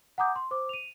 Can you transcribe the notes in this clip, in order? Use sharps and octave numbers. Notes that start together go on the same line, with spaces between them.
F#5 G#5 A#5 D6 D#6 G6
C6
C5 D6
D#7 F7